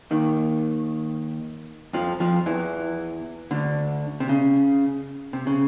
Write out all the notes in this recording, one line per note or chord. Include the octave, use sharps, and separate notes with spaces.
D#2 D#3
F2 F3
F2 F3
E2 E3
D2 D3
C3
C#3
C3
C#3